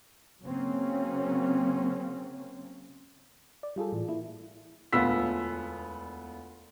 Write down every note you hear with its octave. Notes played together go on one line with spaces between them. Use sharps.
C#3 F#3 A#3 C4 C#4
D5
G3 F4 G#4 A4
A2 E3
A#3 E4
E1 D2 B3 F4 E6 B6